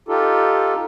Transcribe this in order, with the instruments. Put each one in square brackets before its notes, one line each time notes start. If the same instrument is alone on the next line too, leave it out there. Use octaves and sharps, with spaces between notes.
[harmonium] D#4 F4 G4 A4